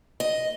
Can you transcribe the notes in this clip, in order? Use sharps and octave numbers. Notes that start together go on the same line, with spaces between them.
D#5